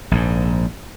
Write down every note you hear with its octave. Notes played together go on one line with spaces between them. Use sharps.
A#1 G#2